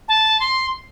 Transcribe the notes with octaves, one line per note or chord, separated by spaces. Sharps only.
A5
C6